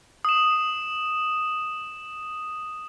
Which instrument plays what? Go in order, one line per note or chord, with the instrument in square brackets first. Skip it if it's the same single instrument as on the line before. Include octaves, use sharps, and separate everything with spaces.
[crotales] D#6 E7